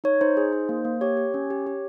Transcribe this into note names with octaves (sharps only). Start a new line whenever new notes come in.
D#4 C#5
D#4 C5
G#4
D#4
A#3
A#3
G4 C#5
G4
C#4
G4
G4